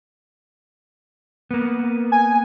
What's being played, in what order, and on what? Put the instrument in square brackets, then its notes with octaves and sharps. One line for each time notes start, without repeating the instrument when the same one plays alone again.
[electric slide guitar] A#3 B3
[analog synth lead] G#5